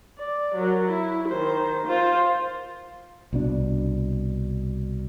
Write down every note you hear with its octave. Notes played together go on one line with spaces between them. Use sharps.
D5
F#3 A#4
E4
D#3 C5
F4 C5
C2 B2 D4